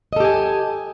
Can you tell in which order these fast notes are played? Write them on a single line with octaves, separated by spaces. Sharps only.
D#5 A4 G4 G#5